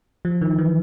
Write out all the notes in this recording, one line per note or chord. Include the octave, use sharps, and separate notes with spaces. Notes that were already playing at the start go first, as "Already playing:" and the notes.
F3
D#3
E3